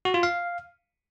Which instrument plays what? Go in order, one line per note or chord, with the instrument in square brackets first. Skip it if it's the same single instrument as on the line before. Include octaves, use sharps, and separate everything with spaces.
[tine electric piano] F#4
F4
F5